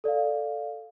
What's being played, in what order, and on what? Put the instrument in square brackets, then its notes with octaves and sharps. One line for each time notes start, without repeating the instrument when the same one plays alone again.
[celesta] A4 D5 F5